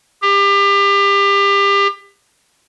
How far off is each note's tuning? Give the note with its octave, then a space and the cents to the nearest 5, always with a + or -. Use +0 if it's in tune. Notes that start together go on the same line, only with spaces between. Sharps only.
G4 +30